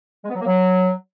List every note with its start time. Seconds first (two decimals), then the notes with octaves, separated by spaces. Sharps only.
0.24 G#3
0.30 B3
0.35 F#3
0.41 A#3
0.46 F#3